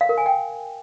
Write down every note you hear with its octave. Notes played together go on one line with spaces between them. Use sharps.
F5
A#4
G#5
G5